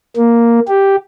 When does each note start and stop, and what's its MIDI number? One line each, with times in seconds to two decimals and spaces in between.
0.17 0.60 58
0.68 0.96 67